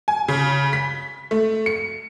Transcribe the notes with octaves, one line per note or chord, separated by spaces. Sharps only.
G#5
C#3
B6
A3
C#7